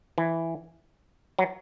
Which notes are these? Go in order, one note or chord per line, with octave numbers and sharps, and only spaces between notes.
E3
F#3